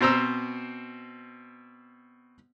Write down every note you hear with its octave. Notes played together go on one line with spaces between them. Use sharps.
B2 C4 C5 A#5 E6